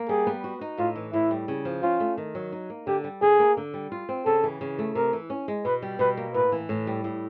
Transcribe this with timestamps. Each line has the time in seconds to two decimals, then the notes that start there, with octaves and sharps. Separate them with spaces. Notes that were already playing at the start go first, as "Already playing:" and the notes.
Already playing: A#3
0.09 G3 G#4
0.27 B3
0.44 F#4
0.61 D#4
0.78 A2 F4
0.96 E3
1.13 A2 E4
1.31 G3
1.48 C#3
1.65 F3
1.83 C#4 F4
2.00 A3
2.17 D#3
2.35 F#3
2.52 D#4
2.70 A#3
2.87 D3 G4
3.04 G3
3.22 D3 G#4
3.39 A#3
3.57 D3
3.74 G3
3.92 F4
4.09 C4
4.26 C#3 A4
4.43 E3
4.61 C#3
4.79 A3
4.95 C3 A#4
5.13 E3
5.30 C#4
5.48 G#3
5.65 B2 B4
5.82 G3
5.99 B2 B4
6.17 A#3
6.34 A2 B4
6.52 E3
6.69 A2
6.87 G3
7.04 A2